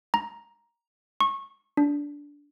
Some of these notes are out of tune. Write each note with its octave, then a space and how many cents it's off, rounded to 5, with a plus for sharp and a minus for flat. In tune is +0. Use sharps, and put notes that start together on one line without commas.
A#5 +10
C#6 -20
D4 -15